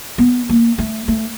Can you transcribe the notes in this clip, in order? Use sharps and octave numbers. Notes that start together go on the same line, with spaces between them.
B3
A#3
A3
A3